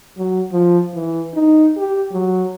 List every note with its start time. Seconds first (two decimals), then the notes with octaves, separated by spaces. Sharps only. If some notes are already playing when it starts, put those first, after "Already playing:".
0.18 F#3
0.52 F3
0.94 E3
1.34 D#4
1.77 G4
2.12 F#3